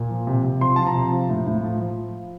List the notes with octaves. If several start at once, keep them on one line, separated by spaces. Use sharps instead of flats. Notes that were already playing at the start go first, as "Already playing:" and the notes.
Already playing: A#2
F3
C3
C3
F3 C6
F3 A5
A#5
C3
F3
A2
A2
F3
F3